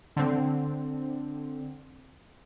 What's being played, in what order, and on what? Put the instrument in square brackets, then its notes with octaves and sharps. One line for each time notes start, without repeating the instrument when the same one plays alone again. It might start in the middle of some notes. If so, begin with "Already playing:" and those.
[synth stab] D3 C4